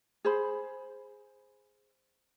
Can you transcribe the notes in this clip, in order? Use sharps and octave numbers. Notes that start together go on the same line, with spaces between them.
G#4 C5 B5